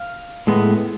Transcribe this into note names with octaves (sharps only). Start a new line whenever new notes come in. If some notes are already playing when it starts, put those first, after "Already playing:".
Already playing: F5
A2 G#3 B3